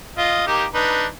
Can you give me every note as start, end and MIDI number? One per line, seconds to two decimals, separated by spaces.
0.18 0.42 65
0.18 0.42 75
0.47 0.64 58
0.47 0.64 63
0.47 0.64 67
0.74 1.06 62
0.74 1.06 63
0.74 1.06 71